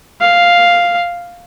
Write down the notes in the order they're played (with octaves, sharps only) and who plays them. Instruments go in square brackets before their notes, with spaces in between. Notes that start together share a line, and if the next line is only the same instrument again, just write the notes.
[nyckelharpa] F5